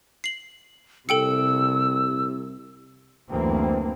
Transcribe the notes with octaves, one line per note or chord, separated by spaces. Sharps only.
C7 F#7
C2 C3 A4 G5 E6 C#7
F#1 D2 E3 A#3 C4